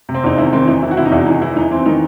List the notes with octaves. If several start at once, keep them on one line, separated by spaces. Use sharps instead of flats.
C3
C4
E2 D#4
D#3 E4
D#3 C4
E3 D#4
E3 E4
F#4
C3 E4
D#4
E2 E4
E3 D#4
E3 E4
E3 D#4
E3 C4
D#3 D#4